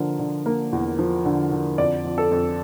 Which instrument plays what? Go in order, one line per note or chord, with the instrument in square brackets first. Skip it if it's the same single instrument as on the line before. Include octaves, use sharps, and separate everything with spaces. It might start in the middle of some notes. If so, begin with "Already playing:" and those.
Already playing: [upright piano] D3 F3 A#3
D3
A#3
E2
F3
D3
D3
F2 D5
F2
A4
F2